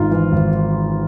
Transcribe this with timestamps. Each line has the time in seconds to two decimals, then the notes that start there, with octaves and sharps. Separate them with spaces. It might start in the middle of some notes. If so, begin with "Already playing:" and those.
Already playing: G#1 G#2 F4
0.11 E3
0.32 G#1